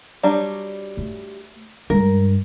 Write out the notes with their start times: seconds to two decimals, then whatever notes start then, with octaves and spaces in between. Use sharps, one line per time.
0.23 F#3 G3 D4
0.97 A3
1.90 G2 G#3 A#4